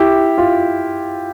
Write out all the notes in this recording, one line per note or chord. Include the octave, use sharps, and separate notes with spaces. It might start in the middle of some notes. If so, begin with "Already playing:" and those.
Already playing: E4 G4
F4